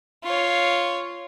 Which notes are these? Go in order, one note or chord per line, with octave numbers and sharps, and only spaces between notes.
F4 C#5